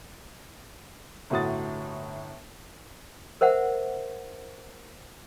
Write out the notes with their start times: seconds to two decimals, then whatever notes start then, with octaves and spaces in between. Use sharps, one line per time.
1.30 G1 A2 F#4 D#6 A6
3.41 A#4 C5 E5 F#5